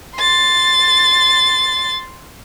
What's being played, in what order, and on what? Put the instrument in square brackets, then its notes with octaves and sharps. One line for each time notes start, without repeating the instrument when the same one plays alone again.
[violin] C6 A6